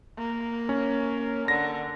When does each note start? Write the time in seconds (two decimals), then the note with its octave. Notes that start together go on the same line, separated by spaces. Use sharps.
0.18 A#3
0.69 C#4
1.48 D3 A#6